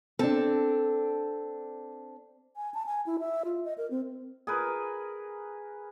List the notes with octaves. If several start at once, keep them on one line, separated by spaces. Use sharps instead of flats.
C4 D4 A4
G#5
A5
G#5
E4
E5
F4
D#5
A#4
C4
G#4 A#4 B4